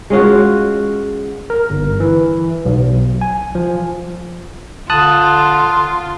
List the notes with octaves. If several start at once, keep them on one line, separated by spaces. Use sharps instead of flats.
G#3 C#4 F4 F#4
A#4
G1
E3
B1
G#5
F3
D3 F4 A5 D#6 F#6